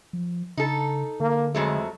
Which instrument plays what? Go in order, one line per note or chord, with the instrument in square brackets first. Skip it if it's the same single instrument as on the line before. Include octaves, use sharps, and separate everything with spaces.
[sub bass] F3
[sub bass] C#3 [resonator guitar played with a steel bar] D#4 A4
[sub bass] D3 [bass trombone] A#3
[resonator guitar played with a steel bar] F2 F#3 A3 [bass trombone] G#3